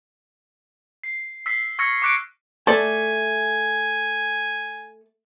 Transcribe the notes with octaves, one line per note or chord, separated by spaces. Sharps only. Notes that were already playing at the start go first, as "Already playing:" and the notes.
C7
E6 B6 C7
C#6 E6 F6 G#6 A#6 C#7
C#6 D6 F#6 C7 D7
A3 A4 D5 G#5